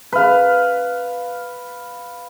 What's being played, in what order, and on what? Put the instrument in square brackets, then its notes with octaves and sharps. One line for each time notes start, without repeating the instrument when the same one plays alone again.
[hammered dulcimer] B4 F5